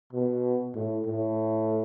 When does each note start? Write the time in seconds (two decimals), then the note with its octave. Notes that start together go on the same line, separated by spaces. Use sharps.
0.13 B2
0.75 A2
1.06 A2